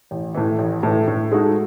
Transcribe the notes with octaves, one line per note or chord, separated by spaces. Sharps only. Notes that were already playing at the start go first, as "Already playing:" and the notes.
A1
A2 E3
A1
A2 E3
A2
G#3 D#4 F#4 A4